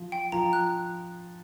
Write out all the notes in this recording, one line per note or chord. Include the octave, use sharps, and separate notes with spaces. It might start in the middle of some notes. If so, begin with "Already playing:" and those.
Already playing: F3
G5
F3 A#5
F#6